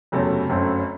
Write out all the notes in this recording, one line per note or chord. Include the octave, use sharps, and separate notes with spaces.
F#1 E2 C3 F#3 A3
G1 F#2 F#3 A3 C4